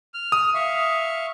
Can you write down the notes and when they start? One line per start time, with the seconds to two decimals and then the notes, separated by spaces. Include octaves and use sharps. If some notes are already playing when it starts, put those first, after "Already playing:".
0.14 F6
0.32 D#6
0.55 E5 F5 C#6